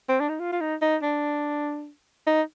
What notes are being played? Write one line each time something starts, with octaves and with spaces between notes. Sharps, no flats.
C4
D4
D#4
F4
F4
D#4
D#4
D4
D#4